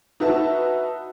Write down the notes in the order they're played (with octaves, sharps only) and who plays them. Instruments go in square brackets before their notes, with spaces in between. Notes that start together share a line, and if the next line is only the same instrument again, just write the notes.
[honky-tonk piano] D#4 F#4 B4 E5 A5